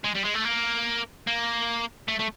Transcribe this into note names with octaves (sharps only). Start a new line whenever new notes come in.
G#3
G3
G#3
A3
A#3
A#3
A3
A3